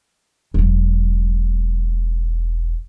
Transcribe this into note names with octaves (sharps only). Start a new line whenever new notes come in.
E1 F#3